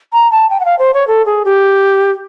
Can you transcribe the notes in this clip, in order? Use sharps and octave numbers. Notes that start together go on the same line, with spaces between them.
A#5
A5
G5
F#5
F5
C5
C#5
A4
G#4
G4